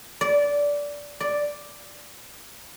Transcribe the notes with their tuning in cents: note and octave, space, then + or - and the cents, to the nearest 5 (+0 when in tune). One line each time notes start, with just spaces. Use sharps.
D5 -15
D5 +0